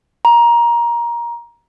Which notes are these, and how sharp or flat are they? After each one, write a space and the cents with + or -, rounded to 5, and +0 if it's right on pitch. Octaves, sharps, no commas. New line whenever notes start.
A#5 +20